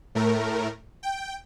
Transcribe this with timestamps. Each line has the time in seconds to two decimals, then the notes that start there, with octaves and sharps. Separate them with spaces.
0.15 A2 A3 A#4
1.03 G5